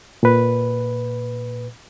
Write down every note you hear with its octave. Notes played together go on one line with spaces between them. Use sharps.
A#2 B4